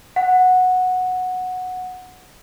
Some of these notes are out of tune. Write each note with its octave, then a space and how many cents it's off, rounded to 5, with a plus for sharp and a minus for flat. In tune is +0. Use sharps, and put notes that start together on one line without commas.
F#5 -10